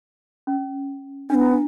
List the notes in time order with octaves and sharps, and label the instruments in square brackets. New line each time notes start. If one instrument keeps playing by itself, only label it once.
[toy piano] C#4
[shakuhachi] B3 C#4 [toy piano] D4
[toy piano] E4
D4